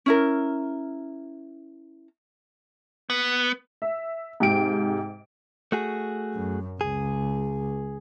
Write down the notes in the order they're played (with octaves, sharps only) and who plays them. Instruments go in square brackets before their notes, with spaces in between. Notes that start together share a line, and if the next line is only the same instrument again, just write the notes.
[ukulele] C#4 E4 A#4
[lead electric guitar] B3
[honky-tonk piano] E5
G#2 C3 G5 D7
[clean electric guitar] A3 F#4 G#4
[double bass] F#2
[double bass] C#2 [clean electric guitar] G#4